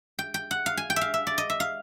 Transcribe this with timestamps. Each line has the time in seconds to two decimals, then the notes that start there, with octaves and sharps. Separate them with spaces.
0.19 G5
0.34 G5
0.51 F#5
0.66 F5
0.77 G#5
0.90 G5
0.96 E5
1.01 F5
1.14 E5
1.27 D5
1.38 D#5
1.50 E5
1.60 F5